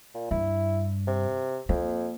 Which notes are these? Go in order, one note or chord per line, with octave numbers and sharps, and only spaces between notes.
A#2
G2 E4
C3
F2 A#3